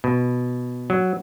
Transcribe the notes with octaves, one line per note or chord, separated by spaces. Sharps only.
B2
F#3